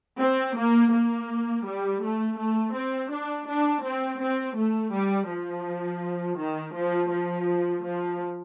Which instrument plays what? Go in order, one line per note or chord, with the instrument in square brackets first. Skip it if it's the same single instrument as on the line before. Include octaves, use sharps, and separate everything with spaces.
[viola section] C4
A#3
A#3
G3
A3
A3
C4
D4
D4
C4
C4
A3
G3
F3
D#3
F3
F3
F3